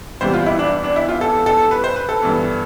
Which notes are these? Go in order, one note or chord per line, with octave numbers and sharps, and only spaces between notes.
E2 C3 E3 G3 B3 C5
F4
E4
D4
D4
E4
F4
A4
A4
B4
C5
B4
A4
G2 E3 B3